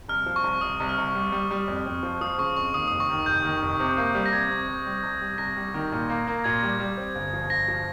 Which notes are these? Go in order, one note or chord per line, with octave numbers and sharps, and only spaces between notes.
C2 F6
F3
C#6
C2
C2 D#6
C2
F6
C2
G3
G3
G3
F2
F2
F3
F3 D#6
C#3 C#6
F2 C#6
D#2 D#6
F1 D#6
C#6
D#3
F1 G6
D#3
F1
C3
A#3
G3
A#6
C3 G#6
C3
C3
G3
C2
G3
C2 A#6
G3
D#3
A#2
A#3
A#3
A#2 G#6
G3
G3
C4
G1
F3
G1 A#6
F3